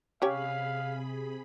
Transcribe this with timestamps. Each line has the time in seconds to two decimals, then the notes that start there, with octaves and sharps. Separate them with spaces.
0.22 C3 C#4 G4 G#4 C#5 F5 B5